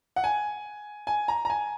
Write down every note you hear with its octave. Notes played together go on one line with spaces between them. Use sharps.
F#5
G#5
G#5
A#5
A#5
G#5